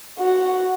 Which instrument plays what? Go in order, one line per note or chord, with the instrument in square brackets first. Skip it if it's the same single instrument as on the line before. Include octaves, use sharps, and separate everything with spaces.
[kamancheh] F#4